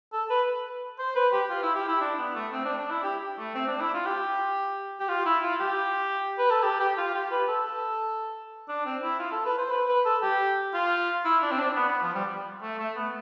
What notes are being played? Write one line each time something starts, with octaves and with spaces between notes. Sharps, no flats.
A4
B4
C5
B4
G4
F4
E4
G4
E4
D4
B3
A3
C4
D4
D4
E4
G4
A3
C4
D4
E4
F4
G4
G4
F4
E4
F4
G4
B4
A4
G4
G4
F4
G4
B4
A4
D4
C4
E4
F4
A4
B4
C5
B4
B4
A4
G4
F4
E4
D4
C4
D4
B3
B3
F3
G3
A3
A3
B3